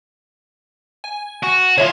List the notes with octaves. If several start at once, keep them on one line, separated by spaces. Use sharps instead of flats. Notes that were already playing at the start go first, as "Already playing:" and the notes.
G#5
F#4
D3 F3 C#5 E5 C6